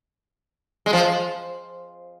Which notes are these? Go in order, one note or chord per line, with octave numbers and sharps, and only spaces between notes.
G#3
F3